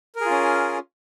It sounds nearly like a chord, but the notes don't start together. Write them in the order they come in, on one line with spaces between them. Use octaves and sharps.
A#4 G#4 F4 C#4